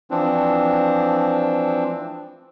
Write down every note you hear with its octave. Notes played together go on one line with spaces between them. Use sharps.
E3 F3 C4 D4